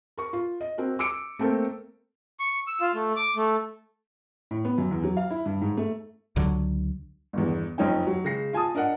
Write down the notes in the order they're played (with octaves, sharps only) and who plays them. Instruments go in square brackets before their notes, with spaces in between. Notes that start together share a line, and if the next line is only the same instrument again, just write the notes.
[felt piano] A#4 C#6
F4
D#5
C4 F#4 A#4
D6 E6 C#7 D7
A3 A#3 C4 A4 A#4
[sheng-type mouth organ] C#6
E6
F4
A3
D6
A3
[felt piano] A2
B3
F#2
E2
F#3
F5
E4
G2
G#2
A3
[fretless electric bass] C#2 D3 F#3
[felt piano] G1 E2
F#1 F2 C#4 D#4 G5
F#3
C#3 G#3 A#6 C7
F4 G#5 A5 D#6
D4 A#4 D#5 F#5